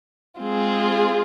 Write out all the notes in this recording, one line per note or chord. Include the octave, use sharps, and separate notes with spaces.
G#3 C4 F4 G#4